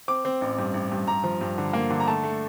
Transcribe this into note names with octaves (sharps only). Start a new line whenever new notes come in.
C4 D6
C4
A1
G2
A1
G2
G2 A#5
F3
G2
D3
A#3
D3
A#5
A3 A5
A3